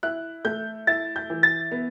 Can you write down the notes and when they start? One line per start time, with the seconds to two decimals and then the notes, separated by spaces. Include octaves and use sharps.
0.03 E4 F#6
0.45 A3 G6
0.87 E4 A6
1.16 G6
1.30 E3
1.43 A6
1.71 B3